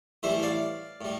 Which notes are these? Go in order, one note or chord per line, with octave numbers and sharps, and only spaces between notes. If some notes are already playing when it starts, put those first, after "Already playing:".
A2 E3 G3 C5 E5
D5 F5
A2 G3